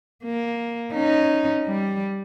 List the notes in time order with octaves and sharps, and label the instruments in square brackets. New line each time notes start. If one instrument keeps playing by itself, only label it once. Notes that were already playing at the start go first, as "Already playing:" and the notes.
[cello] A#3
C#4 D#4
G3